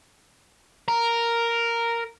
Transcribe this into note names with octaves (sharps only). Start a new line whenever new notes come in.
A#4